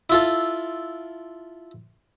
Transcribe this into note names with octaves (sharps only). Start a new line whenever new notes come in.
E4 F4 A4